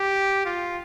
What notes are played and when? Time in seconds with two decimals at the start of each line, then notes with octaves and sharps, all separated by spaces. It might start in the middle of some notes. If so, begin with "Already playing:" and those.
Already playing: G4
0.45 F4